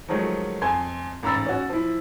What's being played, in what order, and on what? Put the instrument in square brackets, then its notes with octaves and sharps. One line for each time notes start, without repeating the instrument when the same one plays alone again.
[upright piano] D#3 F3 F#3 G#3 A3
F2 G#5 C6 G#6
A1 G#2 A#5 B5 E6 A6
C#4 F#4
F3 E4